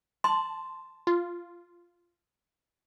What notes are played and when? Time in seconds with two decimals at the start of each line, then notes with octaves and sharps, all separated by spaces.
0.24 A5 C6
1.07 F4